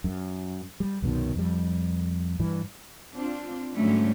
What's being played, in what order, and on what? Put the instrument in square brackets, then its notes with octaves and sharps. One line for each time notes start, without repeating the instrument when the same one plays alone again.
[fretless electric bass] F#2
G3
C2 F#2 B2 D#3
F2 G3
G2 E3
[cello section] C4 D4 F4
G#2 D3 F#3 G3 A3 C#4